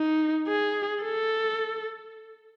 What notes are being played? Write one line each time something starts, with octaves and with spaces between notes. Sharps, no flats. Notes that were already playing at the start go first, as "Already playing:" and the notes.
Already playing: D#4
G#4
A4